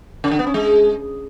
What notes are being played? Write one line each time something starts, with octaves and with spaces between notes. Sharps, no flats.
C#3
D3
B3
C#4
G#3